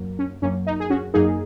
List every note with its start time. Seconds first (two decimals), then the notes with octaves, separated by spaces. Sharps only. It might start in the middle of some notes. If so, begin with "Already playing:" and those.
Already playing: F#2 F#3 A#3
0.19 C#4
0.42 F#2 F#3 A#3 C#4
0.67 D#4
0.80 G#4
0.90 C#4 F#4
1.14 F#2 F#3 A#3 D#4 G#4